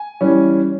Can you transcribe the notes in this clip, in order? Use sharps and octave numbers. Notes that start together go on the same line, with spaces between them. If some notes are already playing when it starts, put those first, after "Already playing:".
Already playing: G#5
E3 G3 C#4